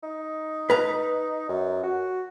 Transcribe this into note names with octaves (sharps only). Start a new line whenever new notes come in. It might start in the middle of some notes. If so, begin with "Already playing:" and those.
D#4
B4 A#5
F#2
F#4